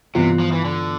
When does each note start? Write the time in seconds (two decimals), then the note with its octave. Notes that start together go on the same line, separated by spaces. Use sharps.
0.15 G2 C3 E3 B3 F4
0.39 F3
0.52 E3
0.65 D3